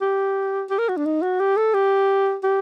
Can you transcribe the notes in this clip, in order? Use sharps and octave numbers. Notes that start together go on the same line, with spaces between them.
G4
G4
A#4
F#4
D4
D#4
F#4
G4
A4
G4
G4